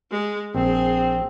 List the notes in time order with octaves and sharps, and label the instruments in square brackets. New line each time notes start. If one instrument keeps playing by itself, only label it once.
[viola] G#3
[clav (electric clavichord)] A#1 [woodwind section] C4 [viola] G#4